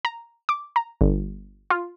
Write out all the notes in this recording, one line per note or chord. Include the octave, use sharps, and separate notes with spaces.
A#5
D6
A#5
G1
F4